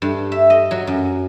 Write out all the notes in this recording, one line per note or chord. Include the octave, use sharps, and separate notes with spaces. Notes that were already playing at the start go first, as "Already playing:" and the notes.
G2
E5
D#5
F#3
F#2